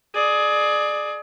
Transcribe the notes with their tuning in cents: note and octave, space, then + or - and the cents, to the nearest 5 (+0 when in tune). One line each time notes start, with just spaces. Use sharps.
G#4 +25 D5 +30